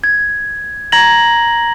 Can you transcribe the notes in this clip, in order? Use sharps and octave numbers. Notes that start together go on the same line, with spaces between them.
G#6
A#5 G#6 A#6 F#7